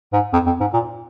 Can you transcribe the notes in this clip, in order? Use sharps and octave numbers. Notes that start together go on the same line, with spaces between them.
G#2
F2
F2
G#2
A#2